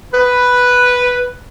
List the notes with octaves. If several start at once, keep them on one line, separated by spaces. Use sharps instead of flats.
B4